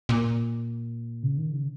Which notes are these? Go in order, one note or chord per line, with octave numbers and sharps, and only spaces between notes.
A#2
C#3
D#3
C#3